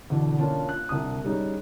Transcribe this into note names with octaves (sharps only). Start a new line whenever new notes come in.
E2 B2 D3
A#3 C#4 D4 F4
F#6
C2 D4 D#6
G3 C#4 D#4 G4 G#4